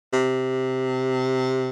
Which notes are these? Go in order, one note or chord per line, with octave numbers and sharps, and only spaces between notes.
C3